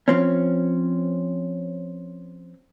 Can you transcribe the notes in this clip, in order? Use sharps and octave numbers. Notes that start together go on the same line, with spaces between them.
F3 C4 C#4